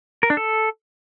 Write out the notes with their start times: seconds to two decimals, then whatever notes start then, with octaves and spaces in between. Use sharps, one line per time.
0.23 A#4
0.30 D4
0.37 A4